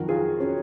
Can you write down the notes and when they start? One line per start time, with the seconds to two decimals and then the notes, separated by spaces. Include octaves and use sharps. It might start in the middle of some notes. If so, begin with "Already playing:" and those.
Already playing: F2 D#3 F#3 F#4 A#4
0.09 F4 G#4
0.40 C#4